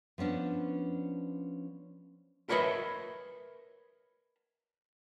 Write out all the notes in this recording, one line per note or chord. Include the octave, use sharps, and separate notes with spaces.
F3 B3 C#4 D4
A#4 B4 C#5 D#5 E5 B5